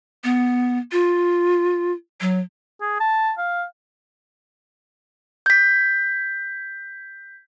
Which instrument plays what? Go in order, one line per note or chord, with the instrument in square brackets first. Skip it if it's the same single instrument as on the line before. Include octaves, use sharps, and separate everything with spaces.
[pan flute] B3
F4
F#3
[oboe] G#4
A5
F5
[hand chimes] G6 B6